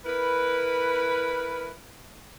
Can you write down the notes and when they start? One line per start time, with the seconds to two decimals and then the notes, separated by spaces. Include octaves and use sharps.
0.05 E4 A#4 B4